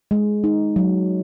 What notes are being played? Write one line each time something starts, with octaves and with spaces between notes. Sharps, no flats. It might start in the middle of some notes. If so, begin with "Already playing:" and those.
G#3
D#4
F#3